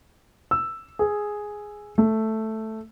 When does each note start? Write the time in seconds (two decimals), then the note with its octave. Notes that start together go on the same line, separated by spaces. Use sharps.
0.51 E6
0.99 G#4
1.98 A3